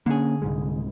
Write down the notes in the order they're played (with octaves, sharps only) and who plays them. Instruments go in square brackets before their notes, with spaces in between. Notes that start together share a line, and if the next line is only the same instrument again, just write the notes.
[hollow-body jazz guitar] D3 G#4 [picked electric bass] A#3 C#4
[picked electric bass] C2 G#2 G#3